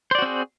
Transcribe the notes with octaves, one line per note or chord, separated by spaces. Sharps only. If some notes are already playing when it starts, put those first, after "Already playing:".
C4 F#4 G#4 C5 D5